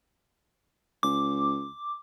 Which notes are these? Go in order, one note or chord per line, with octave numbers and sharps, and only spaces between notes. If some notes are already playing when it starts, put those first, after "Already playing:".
C#2 D6